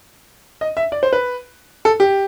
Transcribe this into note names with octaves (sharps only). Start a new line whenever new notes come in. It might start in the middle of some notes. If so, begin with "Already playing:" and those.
D#5
E5
D5
C5
B4
A4
G4